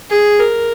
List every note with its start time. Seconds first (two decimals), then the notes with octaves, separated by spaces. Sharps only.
0.10 G#4
0.39 A#4